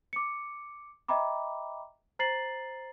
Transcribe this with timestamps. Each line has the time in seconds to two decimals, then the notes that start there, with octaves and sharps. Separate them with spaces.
0.13 D6 C#7
1.08 D#5 E5 G5 A#5 B5 D6
2.19 C5 A#5 A6 C7 F#7